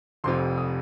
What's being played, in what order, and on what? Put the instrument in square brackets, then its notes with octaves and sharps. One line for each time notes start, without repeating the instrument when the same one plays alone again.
[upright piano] F1 F2 C3 C6
D#6